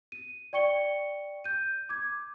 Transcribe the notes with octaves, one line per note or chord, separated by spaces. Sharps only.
D#7
D5 G5 C#6 C#7 G7
G6 D#7
D6 G#6